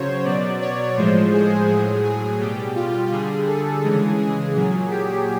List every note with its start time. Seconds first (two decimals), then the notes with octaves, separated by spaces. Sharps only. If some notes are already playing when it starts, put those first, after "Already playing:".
Already playing: C#3 F#3 C5 C#5
0.25 B2 F#3 D5
0.61 C#5
0.97 A2 F3 G#3 C5
1.33 G#4
1.68 A2 F#3
2.04 G#4
2.40 B2 G3 G4
2.76 F4
3.11 D3 G3 G#4
3.48 A4
3.83 C#3 E3 G#3 G#4
4.19 G#4
4.55 A#2 F#3
4.91 G4